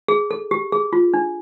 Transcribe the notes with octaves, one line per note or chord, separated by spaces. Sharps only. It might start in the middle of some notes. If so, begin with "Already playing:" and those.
G#4
A4
G4
G#4
F4
D4